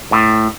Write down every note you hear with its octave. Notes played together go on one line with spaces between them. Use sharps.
A2